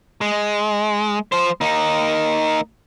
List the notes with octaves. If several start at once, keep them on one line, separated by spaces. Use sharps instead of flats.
G#3
F3 C5
A#3 D#4